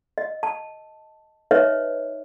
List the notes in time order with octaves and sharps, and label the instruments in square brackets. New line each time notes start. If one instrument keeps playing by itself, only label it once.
[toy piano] D#5
A5
D#4 B4 C#5 D#5 E5